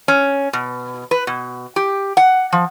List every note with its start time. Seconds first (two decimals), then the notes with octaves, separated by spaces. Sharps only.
0.08 C#4
0.53 B2
1.11 B4
1.27 B2
1.76 G4
2.17 F#5
2.52 F3